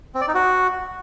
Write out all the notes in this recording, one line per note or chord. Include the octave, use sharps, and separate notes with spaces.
C4
D5
D#4
F#4